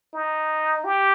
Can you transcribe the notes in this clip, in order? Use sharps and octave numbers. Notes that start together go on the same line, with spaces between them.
D#4
G4